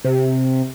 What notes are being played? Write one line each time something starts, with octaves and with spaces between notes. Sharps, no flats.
C3